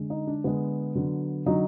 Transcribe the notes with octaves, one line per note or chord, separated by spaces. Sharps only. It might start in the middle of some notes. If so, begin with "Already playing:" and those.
Already playing: D3 G#3
D#4
D4
D3 G#3 B3
D3 F#3
D3 F#3 D#4